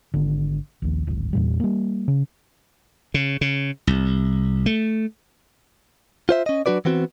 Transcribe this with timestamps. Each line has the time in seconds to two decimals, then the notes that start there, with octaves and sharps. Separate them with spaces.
0.14 G#1 D3
0.82 A#1 D#2
1.07 D1 G#1
1.33 E2 A#2 G3
1.60 G3 A#3
2.08 C#3
3.14 C#3
3.41 C#3
3.87 C2
4.66 A3
6.29 F4 C5 E5
6.46 C#4 D#5
6.66 F#3 D4 F#4 B4 D5
6.85 E3 B3 C4 F#4